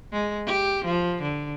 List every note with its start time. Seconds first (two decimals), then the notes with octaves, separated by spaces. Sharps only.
0.12 G#3
0.46 G4
0.85 F3
1.22 D3